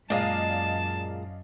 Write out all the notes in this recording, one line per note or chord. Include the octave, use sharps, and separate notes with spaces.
F#2 A#2 G#3 D5 D#5 F5 A5